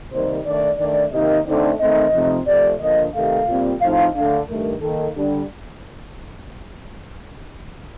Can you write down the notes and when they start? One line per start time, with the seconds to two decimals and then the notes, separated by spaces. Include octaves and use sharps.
0.12 C3 D#3 G3 A#3 D#4 C5
0.45 D#3 A3 D4 D5
0.79 D#3 A3 D4 D5
1.12 C3 D#3 A#3 D#4 D#5
1.46 D3 A3 C4 D#4 D5
1.79 D#3 A3 C4 D#4 D#5
2.13 C3 F3 A3 C4 D#4
2.46 C3 F3 A3 D5
2.80 D3 F3 A#3 D4 D#5
3.14 C3 D#3 A3 F5
3.47 A#2 G3 C4
3.81 A2 F3 C4 D#4 F5
4.14 D3 A3 D4 F5
4.48 G2 D#3 A3 A#4
4.81 D#3 A#3 D#4 A4
5.15 D3 G3 D4